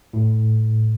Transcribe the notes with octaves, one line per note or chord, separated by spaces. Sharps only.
A2